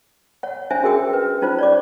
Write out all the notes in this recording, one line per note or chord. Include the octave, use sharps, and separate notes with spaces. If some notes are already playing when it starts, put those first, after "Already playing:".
C#5 F#5
C#4 D4 C5 E5 G#5
C#4 F#4 G#4 A#4 G5 D#6
B4
C#4 D#4 F4 C5
C#5 D5 D6